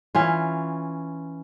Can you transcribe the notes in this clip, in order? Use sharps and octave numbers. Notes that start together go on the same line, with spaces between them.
E3 C#4 F4